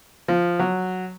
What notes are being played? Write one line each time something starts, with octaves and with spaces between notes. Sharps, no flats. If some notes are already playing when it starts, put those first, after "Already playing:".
F3
F#3